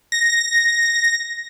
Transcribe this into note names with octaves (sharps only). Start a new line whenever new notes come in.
A#6